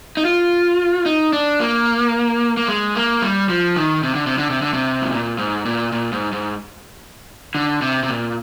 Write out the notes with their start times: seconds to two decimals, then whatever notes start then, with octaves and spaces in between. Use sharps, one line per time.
0.17 D#4
0.25 F4
1.06 D#4
1.33 D4
1.60 A#3
2.57 A#3
2.68 G#3
2.95 A#3
3.22 G3
3.49 F3
3.76 D#3
4.03 C3
4.15 D3
4.27 C3
4.38 D3
4.50 C3
4.62 D3
4.73 C3
5.02 G#2
5.12 A#2
5.38 G#2
5.65 A#2
5.92 A#2
6.12 G#2
6.32 G#2
7.55 D3
7.82 C3
8.03 C3
8.09 A#2